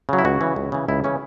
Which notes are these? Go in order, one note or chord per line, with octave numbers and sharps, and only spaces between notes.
C#3 F#3
E4
C#2 F#4
C#3 E3
C#2
C#3 E3
C#2 E4
C#3 E3 C#4